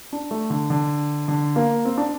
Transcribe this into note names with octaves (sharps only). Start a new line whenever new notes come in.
D4
A3
D3
D3
D3
A#3
C4
D4